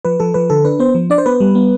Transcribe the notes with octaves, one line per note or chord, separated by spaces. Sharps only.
F3 B4
F3 A4
F3 B4
D3 A4
D4 B4
B3 C5
F3
D4 D5
C5
B3 B4
G3
B3